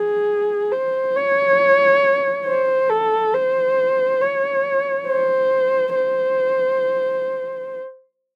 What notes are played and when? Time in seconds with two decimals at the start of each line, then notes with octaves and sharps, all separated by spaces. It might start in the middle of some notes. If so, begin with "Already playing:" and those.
Already playing: G#4
0.72 C5
1.15 C#5
2.46 C5
2.89 A4
3.34 C5
4.21 C#5
5.07 C5
5.95 C5